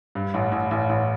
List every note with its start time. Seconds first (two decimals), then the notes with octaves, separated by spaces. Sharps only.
0.15 G2
0.34 A1
0.52 A1
0.71 A1
0.89 A1